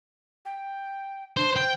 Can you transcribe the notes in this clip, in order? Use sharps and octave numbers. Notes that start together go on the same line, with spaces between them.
G5
D4 C5
C5 G5